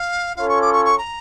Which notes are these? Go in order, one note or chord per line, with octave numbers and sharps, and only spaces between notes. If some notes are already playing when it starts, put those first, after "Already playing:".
Already playing: F5
C#4 F4 A4 C#5 F5
C#6
D6
C#6
C#6
A#5